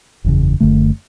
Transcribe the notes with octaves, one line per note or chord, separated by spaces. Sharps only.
F#1 E2 C#3
F#1 F#2 D3 A3